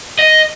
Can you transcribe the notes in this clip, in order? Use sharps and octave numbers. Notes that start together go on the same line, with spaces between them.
D#5